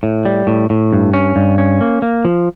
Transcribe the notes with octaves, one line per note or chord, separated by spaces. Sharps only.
A2
G3
A2
A2
G2
C#4
G2
C#4
A#3
A#3
F3